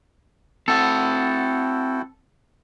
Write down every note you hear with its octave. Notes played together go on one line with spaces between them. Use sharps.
C4 E4 F#4 A4 F#5 G5